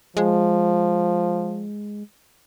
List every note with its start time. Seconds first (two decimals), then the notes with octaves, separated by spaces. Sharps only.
0.17 F3 G#3